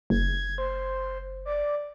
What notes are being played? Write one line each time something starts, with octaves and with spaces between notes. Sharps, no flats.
F#1 G#6
C5
D5